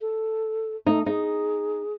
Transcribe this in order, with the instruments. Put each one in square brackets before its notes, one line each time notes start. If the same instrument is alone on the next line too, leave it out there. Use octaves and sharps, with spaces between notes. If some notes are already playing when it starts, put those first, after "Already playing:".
[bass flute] A4
[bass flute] A3 [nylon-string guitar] D#4
[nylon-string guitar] D#4 [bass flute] G#4